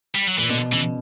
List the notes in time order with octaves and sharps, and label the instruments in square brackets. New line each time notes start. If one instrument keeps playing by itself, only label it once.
[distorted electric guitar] G3
F#3
[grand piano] A#2 [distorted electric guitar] E3
[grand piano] B2 [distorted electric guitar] D3
[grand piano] C#3 [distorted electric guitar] E3